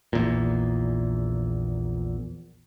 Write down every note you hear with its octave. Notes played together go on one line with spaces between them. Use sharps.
A#1 E2 A#2